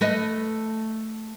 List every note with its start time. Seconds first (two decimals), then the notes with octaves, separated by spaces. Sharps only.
0.01 A3 B4 D#5